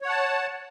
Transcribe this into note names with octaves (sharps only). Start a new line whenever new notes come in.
C#5 F#5 A5